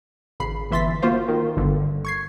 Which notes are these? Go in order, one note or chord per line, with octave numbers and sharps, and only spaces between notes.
G#1 C#3 B5 C7
G1 E3 E5 C6 A6 B6
A#3 F4 F#4 C5 F5
D#3
G1 G2 D3
C#6 G#6 C7